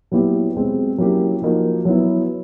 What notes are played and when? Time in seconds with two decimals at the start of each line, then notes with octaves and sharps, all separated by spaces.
0.11 A#2 F#3 B3 E4 G4
0.54 B2 G#3 C4
0.98 F#3 A#3 C#4 E4 G4
1.42 F3 A#3 D#4 F#4
1.85 F#3 B3 E4